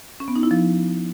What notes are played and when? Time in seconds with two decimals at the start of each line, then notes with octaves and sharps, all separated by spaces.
0.20 C#4
0.28 B3
0.36 D#4
0.43 E4
0.51 F3